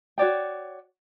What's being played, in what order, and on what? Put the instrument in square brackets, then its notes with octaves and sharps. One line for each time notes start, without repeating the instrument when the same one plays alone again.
[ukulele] F#4 C#5 D5 G5